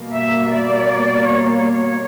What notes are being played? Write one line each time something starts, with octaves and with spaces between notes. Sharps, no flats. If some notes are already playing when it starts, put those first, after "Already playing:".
Already playing: B2 G3 A#3
E5
D5
C#5